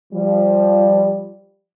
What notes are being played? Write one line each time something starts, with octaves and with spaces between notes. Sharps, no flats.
F3 G3